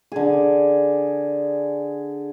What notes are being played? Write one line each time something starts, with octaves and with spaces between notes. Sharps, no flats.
D3 G#4